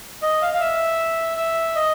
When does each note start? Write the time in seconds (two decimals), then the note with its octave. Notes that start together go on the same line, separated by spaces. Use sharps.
0.22 D#5
0.42 F5
0.54 F5
0.60 E5
1.37 E5
1.75 D#5